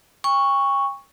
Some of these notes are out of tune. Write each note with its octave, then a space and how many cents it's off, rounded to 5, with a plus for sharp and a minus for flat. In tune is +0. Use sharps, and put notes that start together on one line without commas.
G5 +40 C#6 +0